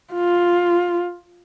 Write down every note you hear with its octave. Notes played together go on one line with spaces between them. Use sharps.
F4